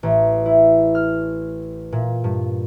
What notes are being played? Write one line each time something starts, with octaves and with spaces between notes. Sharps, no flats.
A1
E4
F6
A#2
G2